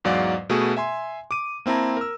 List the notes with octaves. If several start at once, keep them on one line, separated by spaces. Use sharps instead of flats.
E2 G#2 F#3 D5 F5 F#5
B2 A3 B3 F#4 G#4
E5 G#5 C6
D6 D#7
A#3 C4 E4 A5 A#5
A#4 E6